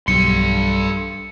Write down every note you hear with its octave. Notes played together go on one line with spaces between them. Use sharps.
B1 G2 A4 C6 C#7